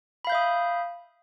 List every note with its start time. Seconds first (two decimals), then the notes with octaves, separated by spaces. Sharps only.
0.25 B5
0.27 F5
0.30 G6
0.32 E5
0.35 D#6